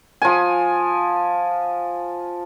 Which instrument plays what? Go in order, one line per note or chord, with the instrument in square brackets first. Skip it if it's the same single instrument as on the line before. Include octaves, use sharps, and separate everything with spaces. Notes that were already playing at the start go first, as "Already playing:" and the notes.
[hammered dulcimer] F3 G#5